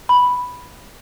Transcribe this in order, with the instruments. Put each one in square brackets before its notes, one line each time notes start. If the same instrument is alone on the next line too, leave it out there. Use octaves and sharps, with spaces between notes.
[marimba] B5